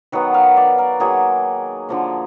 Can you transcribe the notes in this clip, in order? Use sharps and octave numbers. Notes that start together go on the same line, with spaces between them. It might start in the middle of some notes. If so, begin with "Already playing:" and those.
D#3 F#3 B3 F#5
F5
D5
A#4
D#3 F#3 A#3 G#4
D3 F3 A#3